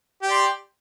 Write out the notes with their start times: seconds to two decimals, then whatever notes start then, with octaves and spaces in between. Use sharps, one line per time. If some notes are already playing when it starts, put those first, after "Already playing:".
0.23 G4
0.27 D5
0.31 C6